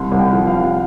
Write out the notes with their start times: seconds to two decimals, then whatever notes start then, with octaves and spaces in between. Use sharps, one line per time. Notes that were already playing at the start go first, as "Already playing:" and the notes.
Already playing: C2 C6
0.12 C2
0.19 G5
0.33 F3
0.47 F5
0.54 C2